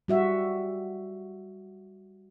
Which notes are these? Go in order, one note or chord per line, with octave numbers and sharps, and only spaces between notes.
G3 F#4 E5